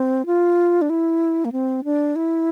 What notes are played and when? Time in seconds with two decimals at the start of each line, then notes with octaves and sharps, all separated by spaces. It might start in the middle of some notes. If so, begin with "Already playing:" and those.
Already playing: C4
0.26 F4
0.82 D4
0.90 E4
1.45 A#3
1.52 C4
1.84 D4
2.16 E4